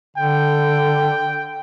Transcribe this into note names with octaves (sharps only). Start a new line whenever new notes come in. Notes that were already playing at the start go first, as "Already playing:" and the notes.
D3 G5